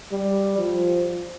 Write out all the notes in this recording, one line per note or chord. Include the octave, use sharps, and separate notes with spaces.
G3
F3